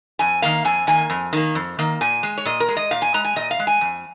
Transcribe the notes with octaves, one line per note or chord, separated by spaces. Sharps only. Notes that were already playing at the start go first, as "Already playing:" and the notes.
F2 G#5
D#3 A#3 F5
F2 G#5
D#3 A#3 G#5
F2
D#3 A#3
F2
D#3 A#3
A#2 G#5
G#3
C#5
A#2 D#5
A#4
G#3
D#5
A#2 F5
G#5
G#3 A#5
G#5
A#2 D#5
F5
G#3
G#5
F2